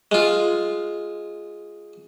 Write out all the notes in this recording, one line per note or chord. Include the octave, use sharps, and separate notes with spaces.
G#3 F4